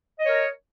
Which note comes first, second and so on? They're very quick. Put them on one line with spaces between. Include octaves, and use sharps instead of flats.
D#5 C#5 A#4